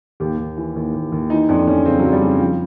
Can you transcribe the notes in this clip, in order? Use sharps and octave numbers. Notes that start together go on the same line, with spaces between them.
D#2 G4
D#2
E3
D#2
D#2
D#2
E3 D#4
F2 D4
F2 C#4
C#3 C4
C#3 F#3
G3
C#3
F3